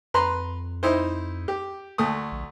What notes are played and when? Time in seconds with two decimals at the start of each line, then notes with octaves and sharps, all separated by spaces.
0.14 F2 B4 A#5 C6
0.83 D#4 E4 C5
1.48 G4
1.98 D2 A3 D#6
2.32 A#1